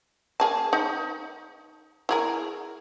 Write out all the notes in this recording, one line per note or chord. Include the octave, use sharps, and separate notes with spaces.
A#3 G#4 A5
D#4
E4 G#4 A#4